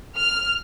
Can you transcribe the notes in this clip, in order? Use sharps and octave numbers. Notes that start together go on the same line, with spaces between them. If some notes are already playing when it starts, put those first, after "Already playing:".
F6